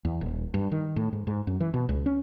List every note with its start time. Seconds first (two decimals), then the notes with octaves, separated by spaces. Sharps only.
0.05 E2
0.21 D#1
0.54 G2
0.72 D#3
0.96 A2
1.13 G#2
1.27 G#2
1.47 F#2
1.60 E3
1.74 B2
1.89 C#2
2.06 C#4